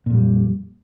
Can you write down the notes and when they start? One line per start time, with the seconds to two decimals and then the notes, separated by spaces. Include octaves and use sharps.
0.06 A#2
0.10 F2
0.14 G3